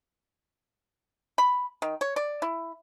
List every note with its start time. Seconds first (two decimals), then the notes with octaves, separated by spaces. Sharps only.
1.38 B5
1.82 D#3
2.01 C#5
2.16 D5
2.42 E4